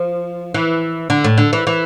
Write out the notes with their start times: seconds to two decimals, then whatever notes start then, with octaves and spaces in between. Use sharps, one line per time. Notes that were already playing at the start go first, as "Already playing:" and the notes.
Already playing: F3
0.54 E3
1.10 D3
1.24 A2
1.38 D3
1.53 E3
1.67 E3